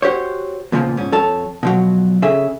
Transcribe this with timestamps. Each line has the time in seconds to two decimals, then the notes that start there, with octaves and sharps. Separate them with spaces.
0.02 F#4 G4 C5 C#5
0.72 E2 A#2 C#3 E3 F3
0.97 G#2 C#4
1.12 F2 A4 C#5 A5
1.63 B2 F3 F#3
2.22 C#3 G#4 A4 E5 G#5